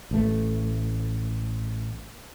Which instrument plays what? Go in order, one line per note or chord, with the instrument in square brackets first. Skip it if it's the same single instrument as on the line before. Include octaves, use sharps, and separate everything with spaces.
[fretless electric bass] A1 A3